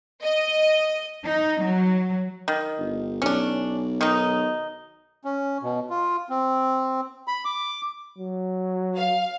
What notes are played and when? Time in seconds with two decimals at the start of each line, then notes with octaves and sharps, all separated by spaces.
0.22 D#5
1.24 D#4
1.63 F#3
2.48 D#3
2.79 G1
3.22 B1 C#4 D4
4.01 D#3 D#4
5.25 C#4
5.63 B2
5.90 F4
6.29 C4
7.28 B5
7.45 D6
8.18 F#3
8.97 F5